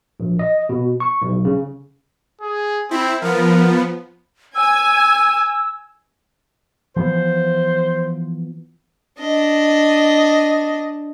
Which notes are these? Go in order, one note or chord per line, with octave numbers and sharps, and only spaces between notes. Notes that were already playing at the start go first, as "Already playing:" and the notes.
A#1
D#5
B2
C#6
B1
C#3
G#4
C4 E4
F3 B3 A#4
G#5 E6
E3 F3 B3 C5
D4 D#5